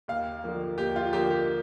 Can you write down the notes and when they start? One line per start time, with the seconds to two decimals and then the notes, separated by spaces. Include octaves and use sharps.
0.08 D#2 F5
0.44 D3 F3 A#3
0.78 D#2 G4
0.96 F4
1.13 D3 F3 A#3 G4
1.30 G4